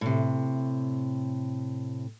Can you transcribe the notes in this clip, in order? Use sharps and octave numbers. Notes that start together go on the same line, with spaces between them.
A2 C3